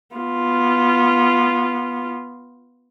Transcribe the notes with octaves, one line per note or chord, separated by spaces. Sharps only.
B3 F4